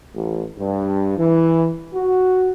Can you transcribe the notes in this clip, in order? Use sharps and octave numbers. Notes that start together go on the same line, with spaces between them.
A1
G2
E3
F#4